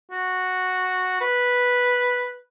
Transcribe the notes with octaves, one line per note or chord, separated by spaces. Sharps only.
F#4
B4